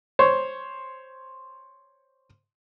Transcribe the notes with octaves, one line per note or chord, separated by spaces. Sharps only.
C5 C#5 C6